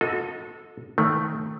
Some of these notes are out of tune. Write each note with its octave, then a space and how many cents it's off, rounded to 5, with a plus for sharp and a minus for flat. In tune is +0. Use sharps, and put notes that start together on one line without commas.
F#4 -35 A4 +0 D#5 +15
D#3 +15 A3 +0